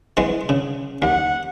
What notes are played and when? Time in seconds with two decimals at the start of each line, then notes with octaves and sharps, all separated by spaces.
0.17 E3 G#3 B3
0.49 C#3
1.02 D#2 F#5